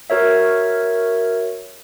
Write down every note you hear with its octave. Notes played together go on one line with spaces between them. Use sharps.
F#4 A#4 C#5 E5